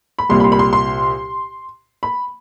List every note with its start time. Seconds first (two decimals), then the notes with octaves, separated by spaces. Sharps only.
0.19 B5
0.29 C2 A#2 G3 C6
0.40 B5
0.44 C6
0.52 B5
0.59 C6
0.73 C6
2.03 B5